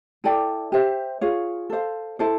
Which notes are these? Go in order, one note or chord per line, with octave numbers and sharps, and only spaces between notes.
E4 A4 D5 G5
G4 C5 E5
F4 G#4 C#5 F5
A4 C5 F5
E4 A4 C5